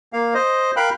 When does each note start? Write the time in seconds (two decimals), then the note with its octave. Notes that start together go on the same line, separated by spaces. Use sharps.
0.13 A#3 F5
0.34 C5 D#5
0.77 A#4 F5 G5 B5 F#6